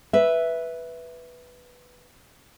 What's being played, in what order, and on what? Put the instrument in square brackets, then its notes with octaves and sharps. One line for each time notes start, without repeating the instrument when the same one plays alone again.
[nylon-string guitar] B4 E5